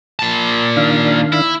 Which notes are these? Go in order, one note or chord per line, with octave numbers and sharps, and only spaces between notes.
A#2 A5
D#3 D4 F5
E4